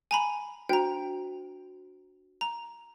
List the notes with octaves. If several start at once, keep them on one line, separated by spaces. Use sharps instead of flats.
G#5 A#5 B5
D4 F#4 C5 G5 A#5
A#5